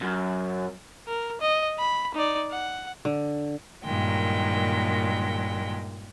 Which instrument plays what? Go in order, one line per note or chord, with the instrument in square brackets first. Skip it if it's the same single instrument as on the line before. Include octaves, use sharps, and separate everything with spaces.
[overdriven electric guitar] F#2
[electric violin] A#4
D#5
B5
D#4 D5
F#5
[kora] D3
[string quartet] G2 A#2 D#3 F#3 G#3 G5